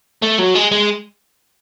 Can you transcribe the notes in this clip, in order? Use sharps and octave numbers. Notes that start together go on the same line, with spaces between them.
A3
F#3
G#3
G#3